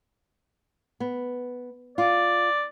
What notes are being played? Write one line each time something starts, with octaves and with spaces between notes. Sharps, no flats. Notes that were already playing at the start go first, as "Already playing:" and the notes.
B3
F4 D5